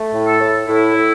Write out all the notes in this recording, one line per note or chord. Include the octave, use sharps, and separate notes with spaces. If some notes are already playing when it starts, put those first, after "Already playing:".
Already playing: A3
A2
A4
A2
A2 E4
A2